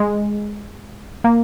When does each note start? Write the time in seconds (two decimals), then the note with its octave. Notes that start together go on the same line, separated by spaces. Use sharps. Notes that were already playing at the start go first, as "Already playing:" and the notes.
Already playing: G#3
1.24 A#3